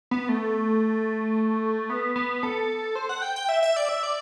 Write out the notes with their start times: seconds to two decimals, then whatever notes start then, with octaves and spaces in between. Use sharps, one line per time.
0.11 B3
0.29 A3
1.90 B3
2.16 B3
2.43 A4
2.95 C5
3.09 F#5
3.22 G5
3.36 G5
3.49 E5
3.63 E5
3.76 D5
3.89 E5
4.03 D5